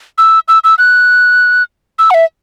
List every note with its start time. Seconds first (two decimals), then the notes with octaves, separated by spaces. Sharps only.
0.18 E6
0.48 E6
0.64 E6
0.78 F#6
1.99 E6
2.10 F#5
2.14 E5